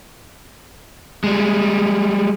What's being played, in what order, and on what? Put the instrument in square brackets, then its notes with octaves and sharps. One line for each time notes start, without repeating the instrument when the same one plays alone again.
[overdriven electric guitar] G3 G#3